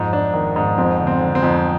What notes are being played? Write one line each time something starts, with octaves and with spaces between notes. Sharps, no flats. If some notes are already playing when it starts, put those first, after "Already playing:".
Already playing: F2 G#2
G#2 D4
D#3 D#4
G#2 D4
F2 C4
D3
C4
D3
C4
F2